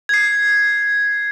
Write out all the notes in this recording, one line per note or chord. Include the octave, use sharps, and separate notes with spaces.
G#6 C7